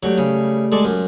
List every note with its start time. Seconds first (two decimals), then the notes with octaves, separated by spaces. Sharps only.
0.03 F#3 G3 A3 G4
0.18 C#3
0.72 G#3 A4 D5
0.85 F#2